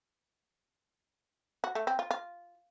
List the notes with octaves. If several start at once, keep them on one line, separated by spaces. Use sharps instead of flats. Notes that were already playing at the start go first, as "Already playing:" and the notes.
F#4
A3
C4
F4
F4